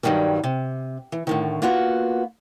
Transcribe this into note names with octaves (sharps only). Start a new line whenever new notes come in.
G2 A#2 D#3 F#3 G3
C3
E3
A2 D3 D#3
A#3 B3 F4 F#4